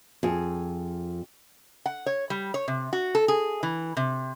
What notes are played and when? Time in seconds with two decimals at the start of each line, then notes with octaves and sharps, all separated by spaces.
0.23 F2 G#4
1.86 F#5
2.06 C#5
2.30 G3
2.54 C#5
2.68 C3
2.93 F#4
3.15 A4
3.28 G#4
3.63 E3
3.97 C3